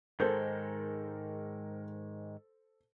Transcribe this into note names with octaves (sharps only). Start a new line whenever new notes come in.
G#2 D#3 G#3 A4 A#4 C5 G6